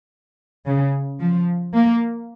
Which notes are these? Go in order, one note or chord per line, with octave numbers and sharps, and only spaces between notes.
C#3
F3
A#3